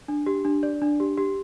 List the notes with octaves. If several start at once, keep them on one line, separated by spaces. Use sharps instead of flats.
D4
G4
D4
D5
D4
G4
G4